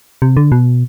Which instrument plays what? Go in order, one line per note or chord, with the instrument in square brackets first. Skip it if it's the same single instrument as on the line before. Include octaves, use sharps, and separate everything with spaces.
[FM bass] C3
D3
B2